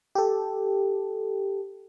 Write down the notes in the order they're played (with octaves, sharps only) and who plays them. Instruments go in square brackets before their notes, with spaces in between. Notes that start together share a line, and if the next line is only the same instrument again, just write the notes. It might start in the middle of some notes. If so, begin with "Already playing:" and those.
[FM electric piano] G4 A4